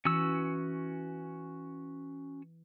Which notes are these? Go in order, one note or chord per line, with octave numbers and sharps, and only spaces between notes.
E3 C#4 F#4 E6